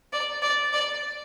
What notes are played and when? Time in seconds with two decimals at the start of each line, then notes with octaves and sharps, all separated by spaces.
0.13 D5
0.42 D5
0.73 D5